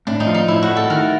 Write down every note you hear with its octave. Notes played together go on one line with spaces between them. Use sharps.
A2 D4
D#4
F3
D#4
A2 E4
F#4
A3
A4
D#3 A#4